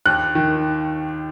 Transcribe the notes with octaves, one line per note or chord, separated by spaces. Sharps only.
D#2 F#6
D#3